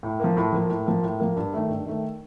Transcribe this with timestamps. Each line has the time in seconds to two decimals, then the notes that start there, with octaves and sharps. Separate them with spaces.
0.03 A2
0.20 F3 A#3
0.37 A2
0.53 F3 A#3
0.70 A2
0.86 F3 A#3
1.03 A2
1.20 F3 A#3
1.36 G2
1.53 D#3 A3
1.70 G2
1.86 D#3 A3